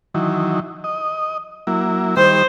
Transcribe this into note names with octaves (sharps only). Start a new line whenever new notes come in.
D#3 E3 F#3
D#5
F#3 A#3 E4
D#3 G3 C5